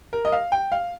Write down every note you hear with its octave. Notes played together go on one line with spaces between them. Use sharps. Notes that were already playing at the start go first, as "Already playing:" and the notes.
A#4
D#5
F5
G5
F5